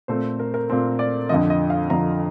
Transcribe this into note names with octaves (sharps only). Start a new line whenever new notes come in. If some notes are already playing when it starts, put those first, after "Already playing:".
A#2 A3 C4 C5
A#4
A#4
A#2 A3 C4
D5
F2 D3 F3 D#5
D#5
F5
F2 D3 F3 A#5